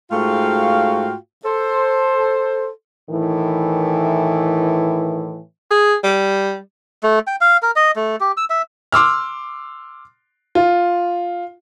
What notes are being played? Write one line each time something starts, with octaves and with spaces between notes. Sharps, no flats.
G#2 A3 F4 F#4 F5 G5
A4 C5
A2 D#3 E3
G#4
G3
A3
G5
F5
A#4
D#5
A3
G4
E6
E5
C6 D6 E6 F6
F4